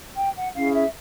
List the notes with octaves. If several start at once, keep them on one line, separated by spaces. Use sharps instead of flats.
G5
F#5
C#4 E4 G#4 F5
E5